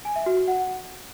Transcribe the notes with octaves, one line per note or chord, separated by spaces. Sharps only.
G#5
E5
F#4
F#4
F#5